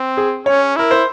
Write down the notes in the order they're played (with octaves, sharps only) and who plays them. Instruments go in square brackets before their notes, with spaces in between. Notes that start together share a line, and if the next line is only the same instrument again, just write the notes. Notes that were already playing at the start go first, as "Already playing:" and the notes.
Already playing: [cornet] C4
[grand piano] G#4
[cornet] C#4 [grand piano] C#5
[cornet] E4 [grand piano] A#4
[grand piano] C5